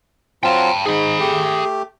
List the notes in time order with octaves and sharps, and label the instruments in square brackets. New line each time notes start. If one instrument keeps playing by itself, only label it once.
[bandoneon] F#3 C4 F4 [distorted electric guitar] G5 A5
[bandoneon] G#2 [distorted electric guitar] G#4 B5
[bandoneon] A3 G4